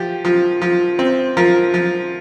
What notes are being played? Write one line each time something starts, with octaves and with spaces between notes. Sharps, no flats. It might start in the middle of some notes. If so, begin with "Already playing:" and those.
Already playing: F3 G4
F3
F3
C4
F3 A#4
F3